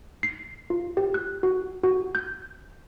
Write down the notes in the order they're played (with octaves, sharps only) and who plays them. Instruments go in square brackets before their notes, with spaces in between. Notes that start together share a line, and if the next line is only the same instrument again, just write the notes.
[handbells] C7
F4
G4
F#6
F#4
F#4
G6